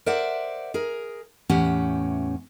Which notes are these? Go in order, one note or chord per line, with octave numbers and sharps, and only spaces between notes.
A#4 C5 D5 E5 F#5
G#4 A#4
E2 A2 C#4 G4 F#5